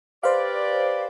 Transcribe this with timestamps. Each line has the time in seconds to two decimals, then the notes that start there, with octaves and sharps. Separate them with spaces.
0.23 G4 B4 C5 D5 F5